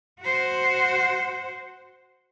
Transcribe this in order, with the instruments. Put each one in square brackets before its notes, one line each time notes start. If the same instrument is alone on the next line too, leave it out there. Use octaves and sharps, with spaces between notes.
[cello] F#4 C5